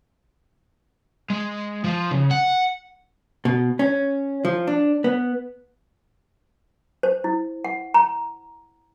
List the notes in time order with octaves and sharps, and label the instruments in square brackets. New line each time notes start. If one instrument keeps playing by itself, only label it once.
[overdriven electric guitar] G#3
F3
C#3
F#5
[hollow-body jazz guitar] B2
C#4
F3
D4
B3
[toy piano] C5
E4
F#5
A#5